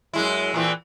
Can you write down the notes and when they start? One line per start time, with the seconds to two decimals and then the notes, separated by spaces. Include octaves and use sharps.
0.13 F#2 G#3 E4
0.54 A#2 E3 C4